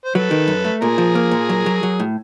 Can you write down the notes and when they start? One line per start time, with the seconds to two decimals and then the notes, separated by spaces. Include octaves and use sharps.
0.05 C5
0.15 F#3 A4 B4
0.31 D#3
0.48 F#2
0.65 A3
0.81 A#2 G#4 A#4
0.98 F3
1.15 A#3
1.31 A#2
1.49 F#3
1.66 F#3
1.83 F#3
2.00 A2